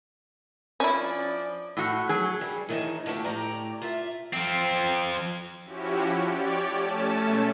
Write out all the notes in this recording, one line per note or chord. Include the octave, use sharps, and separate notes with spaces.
F3 C#4 D4 E4 D5
A2 F#4
F#3 G#4
G3
D#3 E3 D#4 C5 C#5 A5
D3 F3 A3 B3 G4
A2 G4 D5 A#5
F4 E5
F3 C4
F3 C#4 E4 F#4 G4
G4 C#5 D5
A3 C#4 A5
B2 G#3 A3 G#6